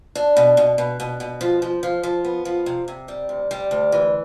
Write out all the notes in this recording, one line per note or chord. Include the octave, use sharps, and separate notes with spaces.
D4
B2
B2
B2
B2
B2
F3
F3
F3
F3
B3
F3
C3
C3
G3
D2
G3
D2
E3